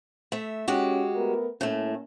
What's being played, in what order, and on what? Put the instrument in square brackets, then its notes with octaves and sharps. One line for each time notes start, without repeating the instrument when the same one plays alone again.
[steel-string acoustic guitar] A3 E5
[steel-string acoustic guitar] G#3 F#4 G4 [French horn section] C#4
[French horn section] A3 B3 A#4
[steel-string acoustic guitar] A2 A3 [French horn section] A#3 C#4